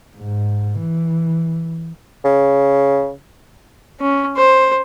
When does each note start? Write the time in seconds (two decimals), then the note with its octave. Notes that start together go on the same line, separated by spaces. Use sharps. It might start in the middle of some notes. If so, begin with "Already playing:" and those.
0.17 G#2
0.79 E3
2.25 C#3
4.01 C#4
4.37 C5